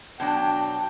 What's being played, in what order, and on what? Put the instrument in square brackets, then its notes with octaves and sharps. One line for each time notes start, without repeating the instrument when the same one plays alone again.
[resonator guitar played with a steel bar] B2 F#3 D4 [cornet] G5